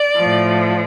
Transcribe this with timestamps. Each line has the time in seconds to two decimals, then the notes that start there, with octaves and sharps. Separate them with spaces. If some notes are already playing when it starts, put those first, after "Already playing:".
Already playing: D5
0.15 A2 F3